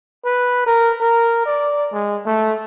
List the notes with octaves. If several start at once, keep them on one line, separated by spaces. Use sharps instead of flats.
B4
A#4
A#4
D5
G#3
A3